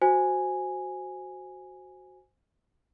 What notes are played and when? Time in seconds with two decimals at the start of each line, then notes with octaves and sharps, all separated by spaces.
0.02 F#4 C5 G#5